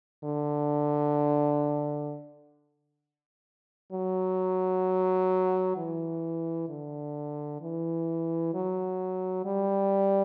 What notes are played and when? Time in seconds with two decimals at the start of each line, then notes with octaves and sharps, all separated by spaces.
0.24 D3
3.92 F#3
5.77 E3
6.69 D3
7.62 E3
8.54 F#3
9.46 G3